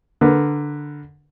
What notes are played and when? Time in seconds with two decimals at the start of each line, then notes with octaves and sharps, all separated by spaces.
0.21 D3 A#4 B4